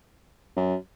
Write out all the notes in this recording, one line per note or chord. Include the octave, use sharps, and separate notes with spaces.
F#2